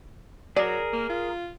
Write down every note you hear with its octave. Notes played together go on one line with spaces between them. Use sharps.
F#3 G#4 A#4 D5
A#3
F4